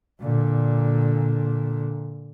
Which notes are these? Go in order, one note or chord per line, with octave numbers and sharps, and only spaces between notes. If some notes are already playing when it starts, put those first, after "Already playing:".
A#2 D3